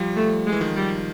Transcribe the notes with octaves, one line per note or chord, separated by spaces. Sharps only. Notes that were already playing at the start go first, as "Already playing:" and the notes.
Already playing: F3 G3
A3
G#3
E3
D#3 F3
G3